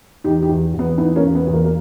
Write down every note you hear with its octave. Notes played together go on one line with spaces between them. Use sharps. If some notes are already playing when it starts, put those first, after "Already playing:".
E2 D#4 G4
D#4 G4
E2
E2
B3
E3 B3 D#4
A#3 C#4
E2
B3
E2
A#3
A#3